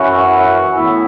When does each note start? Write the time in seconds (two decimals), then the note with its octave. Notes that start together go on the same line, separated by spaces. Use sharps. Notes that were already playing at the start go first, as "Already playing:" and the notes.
Already playing: F#2 E3 C#4 E4 F#4 F#5
0.75 A2 E3 B3 E4 E5